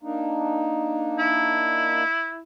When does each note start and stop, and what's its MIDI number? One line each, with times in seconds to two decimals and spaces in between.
0.03 2.03 58
0.03 2.03 62
0.03 2.03 63
1.19 2.42 64